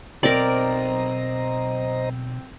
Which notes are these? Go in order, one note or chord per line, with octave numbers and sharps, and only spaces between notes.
B1 C4 A#4 C5 D5 D#5 A#5